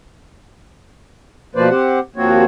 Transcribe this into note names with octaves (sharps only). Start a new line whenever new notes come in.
B2 F3 A#3 B4 C5 D5
C4 G4 C5 F#5
D#2 F3 A#3 C4 F#4 C#5